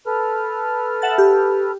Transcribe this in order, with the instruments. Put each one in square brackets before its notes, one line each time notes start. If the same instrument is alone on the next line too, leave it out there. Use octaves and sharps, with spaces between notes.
[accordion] A4 B4 F6
[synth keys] E5 F#5 A6
G4